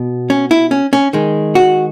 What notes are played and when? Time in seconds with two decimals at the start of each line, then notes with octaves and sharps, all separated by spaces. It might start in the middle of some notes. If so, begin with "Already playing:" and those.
Already playing: B2
0.30 C#4
0.51 E4
0.71 C#4
0.93 C#4
1.13 D#3 G#3
1.55 F#4